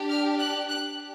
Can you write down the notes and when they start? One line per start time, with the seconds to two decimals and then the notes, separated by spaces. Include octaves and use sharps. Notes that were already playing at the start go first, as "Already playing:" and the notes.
Already playing: D4 G4
0.11 F6
0.40 F#6
0.69 D4 G4 F#6